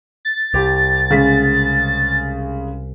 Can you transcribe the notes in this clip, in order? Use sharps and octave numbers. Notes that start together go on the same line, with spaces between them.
A6
C2 G4
C#3 G#3 B6